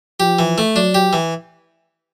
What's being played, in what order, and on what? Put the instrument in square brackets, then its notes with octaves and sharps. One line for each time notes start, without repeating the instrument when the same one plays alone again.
[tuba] F3 [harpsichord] G4
[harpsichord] E3
A3
[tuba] F#3 [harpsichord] D4
[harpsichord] G4
E3